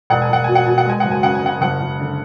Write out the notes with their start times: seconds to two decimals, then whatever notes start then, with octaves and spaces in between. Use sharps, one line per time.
0.10 E1 F#5
0.22 G#5
0.29 E1 F#5
0.44 B2 G#5
0.55 F#5
0.67 B2 G#5
0.78 F#5
0.86 G#3 G#5
1.00 F#1 F#5
1.11 G#5
1.23 C#3 F#5
1.35 G#5
1.43 C#3 F#5
1.61 F#1 F#5
1.80 F#1
2.00 D3